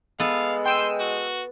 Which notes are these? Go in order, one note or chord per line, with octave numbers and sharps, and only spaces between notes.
G#3 B3 A4 F5
G5 C6 E6 D#7
F#4